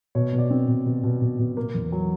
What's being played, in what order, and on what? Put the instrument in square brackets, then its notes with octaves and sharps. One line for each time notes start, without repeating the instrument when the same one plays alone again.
[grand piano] B2 C#5
B2
D5
C4
B2
B2
B2
B2
B2
A#3
E2
F#3